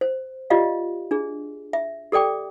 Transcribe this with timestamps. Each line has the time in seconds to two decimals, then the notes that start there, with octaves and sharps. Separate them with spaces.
0.01 C5
0.50 F4 G4 D5 D#5 F5
1.11 D4 G#4
1.73 E5
2.12 G4 A4 D5 G5 D6